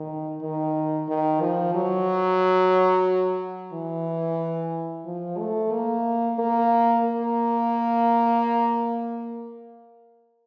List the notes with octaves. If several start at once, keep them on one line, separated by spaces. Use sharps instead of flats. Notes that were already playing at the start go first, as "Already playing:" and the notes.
Already playing: D#3
D#3
D#3
F3
F#3
E3
F3
A3
A#3
A#3
A#3